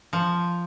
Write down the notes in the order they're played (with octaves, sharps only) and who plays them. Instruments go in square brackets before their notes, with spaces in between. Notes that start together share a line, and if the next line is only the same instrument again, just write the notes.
[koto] F3